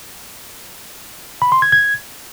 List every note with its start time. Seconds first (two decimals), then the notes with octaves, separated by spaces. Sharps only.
1.42 B5
1.52 C6
1.62 G#6
1.72 G#6